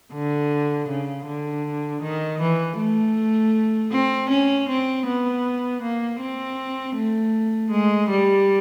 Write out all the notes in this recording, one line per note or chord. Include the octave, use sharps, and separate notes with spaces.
D3
C#3
D3
D#3
E3
A3
C4
C#4
C4
B3
A#3
C4
A3
G#3
G3